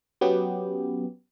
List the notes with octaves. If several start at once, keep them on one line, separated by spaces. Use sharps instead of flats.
F#3 B3 C#4 G4